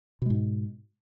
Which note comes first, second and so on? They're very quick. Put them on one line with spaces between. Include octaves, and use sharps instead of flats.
B2 G#3 G#2